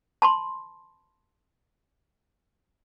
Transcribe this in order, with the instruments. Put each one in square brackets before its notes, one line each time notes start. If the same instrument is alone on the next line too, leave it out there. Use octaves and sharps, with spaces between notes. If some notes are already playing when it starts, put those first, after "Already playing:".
[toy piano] A5 B5 C6